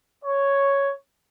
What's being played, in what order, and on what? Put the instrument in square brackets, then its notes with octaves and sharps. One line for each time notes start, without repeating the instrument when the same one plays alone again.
[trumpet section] C#5